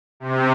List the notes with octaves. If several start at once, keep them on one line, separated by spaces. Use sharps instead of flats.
C3